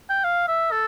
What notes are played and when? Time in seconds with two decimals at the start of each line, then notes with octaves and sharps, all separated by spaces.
0.10 G5
0.24 F5
0.48 E5
0.72 A4